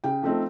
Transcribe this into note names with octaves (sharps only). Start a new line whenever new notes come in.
C#3 G5
F3 A3 C4 D#4